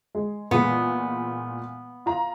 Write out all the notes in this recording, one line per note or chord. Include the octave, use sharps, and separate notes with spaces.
G#3
A#2 E3 G#3 B3
F4 A#5